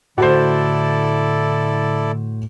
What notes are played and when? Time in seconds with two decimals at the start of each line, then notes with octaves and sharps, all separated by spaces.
0.18 A2 D3 E4 F#4 A4 C5 D5